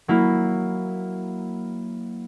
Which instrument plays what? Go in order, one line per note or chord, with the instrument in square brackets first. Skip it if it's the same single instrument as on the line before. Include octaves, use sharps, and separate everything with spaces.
[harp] F#3 A#3 E4